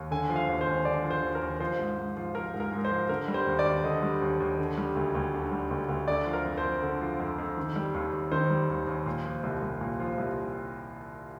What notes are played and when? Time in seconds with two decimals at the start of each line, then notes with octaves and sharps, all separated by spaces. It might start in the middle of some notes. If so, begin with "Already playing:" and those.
Already playing: D#2
0.11 D3 G#5
0.29 F3
0.36 F5
0.49 D#2
0.61 C5
0.67 D#2
0.85 D3 D5
1.04 F3
1.11 C5
1.23 D#2
1.35 A#4
1.42 D#2
1.60 F3 C5
1.79 G#2
1.98 G#2
2.17 F3
2.35 F3 A#4
2.54 G#2
2.60 A#4
2.72 G#2
2.85 C5
2.91 F3
3.09 D3 A#4
3.28 G3
3.34 C5
3.47 D#2
3.59 D5
3.65 D#2
3.84 D3 D#5
4.02 G3
4.22 D#2
4.40 D#2
4.58 D3
4.77 G3
4.96 D2
5.15 D2
5.34 D3
5.51 G3
5.71 D2
5.89 D2
6.08 D3 D5
6.26 F3
6.33 A#4
6.45 F2
6.58 C5
6.64 F2
6.82 D3
7.01 F3
7.19 F2
7.38 F2
7.57 D#3
7.76 G3
7.94 D#2
8.13 D#2
8.32 D#3 C5
8.50 G3
8.69 D#2
8.87 D#2
9.06 A#2
9.25 F3
9.43 C2
9.62 C2
9.81 A#2
10.00 F3
10.18 C2